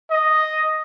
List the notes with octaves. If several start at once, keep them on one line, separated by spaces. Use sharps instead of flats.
D#5